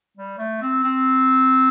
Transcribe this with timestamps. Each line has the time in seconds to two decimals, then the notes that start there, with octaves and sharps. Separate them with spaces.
0.17 G3
0.38 A3
0.62 C4
0.83 C4